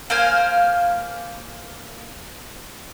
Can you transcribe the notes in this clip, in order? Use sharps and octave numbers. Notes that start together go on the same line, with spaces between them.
A#3 C5 F5 G#5